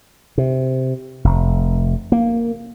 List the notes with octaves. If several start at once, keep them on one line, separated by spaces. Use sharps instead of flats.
C3
F1
A#3